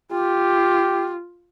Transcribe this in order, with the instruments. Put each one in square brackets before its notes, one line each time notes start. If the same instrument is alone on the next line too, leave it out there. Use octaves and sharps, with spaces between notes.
[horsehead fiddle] F4 [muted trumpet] G4